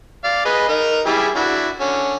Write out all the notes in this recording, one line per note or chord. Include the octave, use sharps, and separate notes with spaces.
D5 F5
G#4 B4 D#5
D#4 A#4
G3 E4 G#4
D4 E4 F#4
D3 C#4